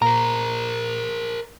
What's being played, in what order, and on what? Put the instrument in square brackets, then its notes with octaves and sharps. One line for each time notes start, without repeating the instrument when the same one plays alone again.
[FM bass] A#2 [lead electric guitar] A#4 C5 [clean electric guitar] A#5